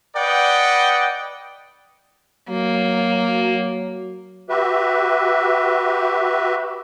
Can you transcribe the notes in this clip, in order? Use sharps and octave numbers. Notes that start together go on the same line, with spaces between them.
B4 D5 D#5 F#5 G5
F#3 A#3
F#4 G4 B4 E5